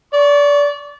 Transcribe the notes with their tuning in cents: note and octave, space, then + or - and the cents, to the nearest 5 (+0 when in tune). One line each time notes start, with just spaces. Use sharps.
D5 -25 C#6 +0